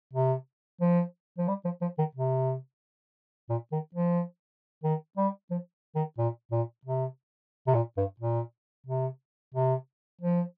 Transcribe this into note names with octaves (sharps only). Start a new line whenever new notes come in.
C3
F3
F3
G3
F3
F3
D#3
C3
A#2
D#3
F3
D#3
G3
F3
D#3
A#2
A#2
C3
C3
A#2
G2
A#2
C3
C3
F3